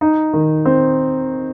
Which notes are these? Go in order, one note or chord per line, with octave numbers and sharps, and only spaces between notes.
D#4
D#3
C4